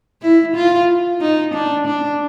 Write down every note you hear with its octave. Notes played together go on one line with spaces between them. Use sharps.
E4
F4
D#4
D4
D4